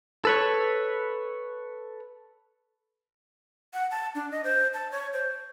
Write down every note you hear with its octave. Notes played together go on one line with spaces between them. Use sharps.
A4 B4 C#5
F#5
A5
D4
D#5
C5
A5
C#5
C5